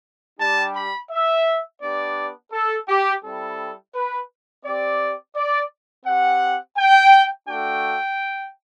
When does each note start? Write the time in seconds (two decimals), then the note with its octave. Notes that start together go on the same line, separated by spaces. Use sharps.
0.39 G3 D4 G4 A5
0.75 B5
1.11 E5
1.81 B3 D4 G4 D5
2.53 A4
2.88 G4
3.23 G3 C4 E4 A4
3.95 B4
4.65 C4 G4 D5
5.36 D5
6.06 C4 G4 F#5
6.77 G5
7.49 A3 D4 F#4 G5